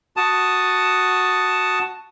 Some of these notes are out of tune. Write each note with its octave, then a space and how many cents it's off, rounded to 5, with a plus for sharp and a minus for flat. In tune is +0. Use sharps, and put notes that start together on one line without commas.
F#4 +0 A5 +0 D#6 +0